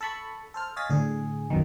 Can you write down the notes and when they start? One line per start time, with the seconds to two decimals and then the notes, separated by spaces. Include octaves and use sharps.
0.01 A4 A5 B5 C#6
0.54 A4 C5 F6
0.76 C#5 D#5 F5 G#5 A6 B6
0.90 A2 D3 G#4
1.50 B1 F#2 B2 D#3